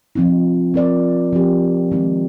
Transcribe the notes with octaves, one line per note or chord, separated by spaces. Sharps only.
F3 C4 D#4
C4 F4 A#4 D5
F3 C4 G4
D#3 G#3 C4 D#4